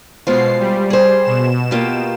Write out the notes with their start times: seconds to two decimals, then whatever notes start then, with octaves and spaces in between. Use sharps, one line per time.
0.27 B2 G#3 F4 C5 C7
0.59 G3
0.90 G#4 C5
1.24 B2 E7
1.71 A#3 F4 G4